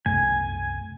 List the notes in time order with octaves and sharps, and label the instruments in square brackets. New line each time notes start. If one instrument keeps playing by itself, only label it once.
[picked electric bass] C2 F#2 A3 [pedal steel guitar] G#5